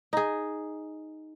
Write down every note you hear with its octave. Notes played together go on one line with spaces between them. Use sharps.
D#4 G#4